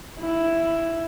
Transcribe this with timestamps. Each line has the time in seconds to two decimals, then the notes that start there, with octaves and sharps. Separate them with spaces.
0.20 E4